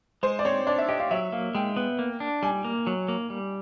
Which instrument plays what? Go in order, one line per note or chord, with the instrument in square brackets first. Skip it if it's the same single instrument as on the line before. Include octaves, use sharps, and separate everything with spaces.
[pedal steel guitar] G#3 [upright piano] C5
[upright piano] D5
[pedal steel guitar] C4 [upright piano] C#5
[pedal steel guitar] D4 [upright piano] D5
[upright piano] E5
[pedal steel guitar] G4 [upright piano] D#5
[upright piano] F5
[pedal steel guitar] F#3 [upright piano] E5
[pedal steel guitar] A#3 [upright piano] F5
[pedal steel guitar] G#3 [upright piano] G5
[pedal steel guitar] B3
A#3
D4
[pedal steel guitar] G3 [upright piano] G#5
[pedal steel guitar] A#3
F#3
A#3
G3